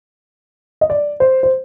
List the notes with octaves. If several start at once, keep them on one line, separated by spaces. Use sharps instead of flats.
D#5
D5
C5
C5